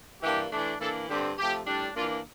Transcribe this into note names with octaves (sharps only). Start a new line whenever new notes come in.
G2 E3 A#3 D4 G4
E3 A3 D4
E3 A#3 D4 A4
G2 D3 G3 C4 G4
C3 F3 A3 G4
A2 G3 D4
E3 A#3 D4 F4